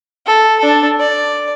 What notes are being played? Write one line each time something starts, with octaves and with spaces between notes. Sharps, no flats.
A4
D4 A4
D5